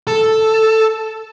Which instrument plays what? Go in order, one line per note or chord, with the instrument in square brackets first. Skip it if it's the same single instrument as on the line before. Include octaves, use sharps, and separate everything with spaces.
[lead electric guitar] A4